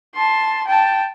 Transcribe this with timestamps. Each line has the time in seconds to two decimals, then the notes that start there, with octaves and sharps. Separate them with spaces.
0.15 A5 C6
0.67 G5 A5